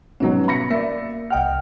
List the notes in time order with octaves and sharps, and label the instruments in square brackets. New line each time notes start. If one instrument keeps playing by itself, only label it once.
[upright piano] G#2 B2 F#3 [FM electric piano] G3 B3 C#4
[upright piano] B5 A#6 C#7
[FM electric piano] A#3 [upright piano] D5 E5
[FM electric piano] C2 D#5 F6 [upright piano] F#5 G5